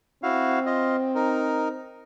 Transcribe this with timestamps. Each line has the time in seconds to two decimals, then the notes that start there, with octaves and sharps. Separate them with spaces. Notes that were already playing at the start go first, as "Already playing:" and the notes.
0.23 C4 E4 F#4 F5
0.66 F4 D#5
1.15 D#4 A#4